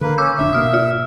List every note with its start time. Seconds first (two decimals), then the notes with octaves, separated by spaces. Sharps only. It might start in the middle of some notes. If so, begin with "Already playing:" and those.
0.01 D3 A#3 B4
0.18 C#4 D6 E6 G6
0.39 F1 A#1 D4 E5
0.53 G#2 B2 A#3 D#6 F6
0.73 F4 F6